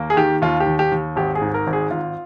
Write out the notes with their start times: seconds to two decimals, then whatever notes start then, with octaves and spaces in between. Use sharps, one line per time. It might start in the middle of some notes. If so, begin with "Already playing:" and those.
Already playing: D#2 A#3
0.10 G#4
0.17 D#3 G4
0.42 D#2 F4
0.60 G4
0.66 D#2
0.79 G4
0.92 D#2
1.16 G#1 G4
1.35 G#4
1.42 G#2
1.54 A#4
1.67 G#1
1.73 G#4
1.91 G#1 F4